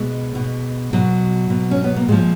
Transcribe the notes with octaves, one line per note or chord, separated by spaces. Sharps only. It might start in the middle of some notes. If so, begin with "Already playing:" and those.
Already playing: B2 G#3
B2
B2 F#3
B2
C#4
B3
A#3
A#2 F3 G#3